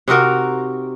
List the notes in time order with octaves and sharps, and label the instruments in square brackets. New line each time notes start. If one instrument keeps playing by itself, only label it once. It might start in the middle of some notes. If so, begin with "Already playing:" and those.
[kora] C3 D#4 F#4 A#4